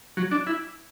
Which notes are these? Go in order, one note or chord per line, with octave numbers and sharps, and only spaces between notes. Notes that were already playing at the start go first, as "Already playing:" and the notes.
F#3
D4
E4